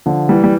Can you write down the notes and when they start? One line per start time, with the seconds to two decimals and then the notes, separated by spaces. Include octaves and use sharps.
0.06 D3 F3
0.29 E3 G3
0.44 G3